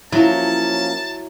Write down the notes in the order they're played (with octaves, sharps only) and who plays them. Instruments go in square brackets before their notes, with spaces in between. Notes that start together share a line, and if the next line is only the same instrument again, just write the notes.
[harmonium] F3 A#3 C#4 [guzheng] F#3 [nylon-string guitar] E4 [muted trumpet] A5